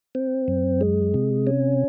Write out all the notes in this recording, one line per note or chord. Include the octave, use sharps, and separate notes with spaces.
C4
F#2
G#3
C3
C#4